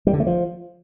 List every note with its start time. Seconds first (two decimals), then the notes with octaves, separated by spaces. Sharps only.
0.07 G3
0.13 D3
0.20 A3
0.27 F3